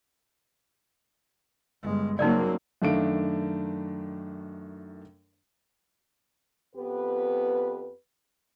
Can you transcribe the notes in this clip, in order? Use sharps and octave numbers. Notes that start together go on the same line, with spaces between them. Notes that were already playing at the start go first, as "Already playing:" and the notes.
G1 G#3
C#3 F#3 A#3 C4 D#4 A#4 D5
F#2 D#3 A3 D4 F5 D7
F2 B3 G4 B4